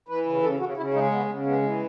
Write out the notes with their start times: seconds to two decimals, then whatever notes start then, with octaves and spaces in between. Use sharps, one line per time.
0.08 E3 B4
0.25 C#3
0.43 C#3 A4
0.60 C#3 F#4
0.77 C#3 E4
0.94 G#3 D#4
1.11 C#3 B3
1.29 C#3
1.46 G#3 B3
1.63 E3